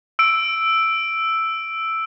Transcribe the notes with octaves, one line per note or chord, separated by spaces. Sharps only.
E6 D7